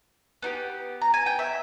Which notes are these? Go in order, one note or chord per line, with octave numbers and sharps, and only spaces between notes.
B3 D#4 G4
A#5
G#5
G5
E5